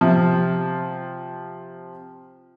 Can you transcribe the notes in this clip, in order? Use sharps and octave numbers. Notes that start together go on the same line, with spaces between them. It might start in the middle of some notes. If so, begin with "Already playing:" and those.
C3 F3